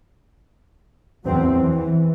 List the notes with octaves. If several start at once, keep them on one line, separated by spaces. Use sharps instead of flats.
E2 F#3 C4
E3